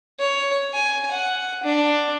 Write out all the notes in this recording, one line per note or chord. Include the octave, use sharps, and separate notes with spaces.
C#5
G#5
F#5
D4